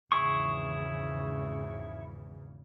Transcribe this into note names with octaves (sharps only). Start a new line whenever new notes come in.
G#1 E2 C#3 E4 G#4 C#6